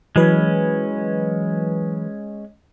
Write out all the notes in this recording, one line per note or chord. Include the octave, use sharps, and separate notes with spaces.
E3 F#3 G#3 C#4 B4